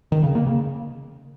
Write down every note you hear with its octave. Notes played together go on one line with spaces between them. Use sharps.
D#3
C#3
A#3
C#3